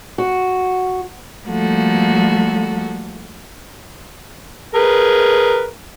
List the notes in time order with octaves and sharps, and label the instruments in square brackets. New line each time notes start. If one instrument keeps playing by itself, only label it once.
[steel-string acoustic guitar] F#4
[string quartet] F3 G3 A3 A#3 F#4 A4
[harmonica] G#4 A#4 B4